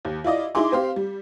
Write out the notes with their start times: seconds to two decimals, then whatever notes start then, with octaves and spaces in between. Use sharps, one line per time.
0.05 D#2
0.24 E4 F4 D5 D#5
0.55 D#4 E4 G#4 C6 D6
0.72 C4 G4 F5
0.96 G3